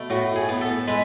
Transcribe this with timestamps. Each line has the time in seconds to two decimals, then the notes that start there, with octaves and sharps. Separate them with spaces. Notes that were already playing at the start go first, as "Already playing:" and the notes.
Already playing: B2 A3
0.10 A2 F#4
0.36 G#4
0.49 B3
0.61 A4
0.88 G#3 B4